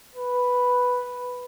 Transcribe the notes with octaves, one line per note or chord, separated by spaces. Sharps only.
B4